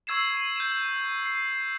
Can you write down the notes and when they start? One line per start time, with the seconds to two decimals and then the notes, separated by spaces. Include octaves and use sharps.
0.07 C#6 E6 G#6 C7 E7
0.37 D#7
0.56 G6 D#7 E7
1.26 C7